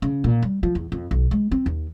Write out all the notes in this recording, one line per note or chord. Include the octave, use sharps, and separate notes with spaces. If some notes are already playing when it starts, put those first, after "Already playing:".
C#3
A#2
G3
F3
E2
F2
B1
G#3
C4
D#2